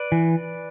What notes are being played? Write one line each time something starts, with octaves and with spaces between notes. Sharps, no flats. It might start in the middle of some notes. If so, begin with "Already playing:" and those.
Already playing: B4 D5
E3